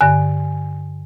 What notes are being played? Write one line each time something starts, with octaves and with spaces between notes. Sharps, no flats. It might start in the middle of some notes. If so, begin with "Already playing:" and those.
G2 D3 G#5 F#6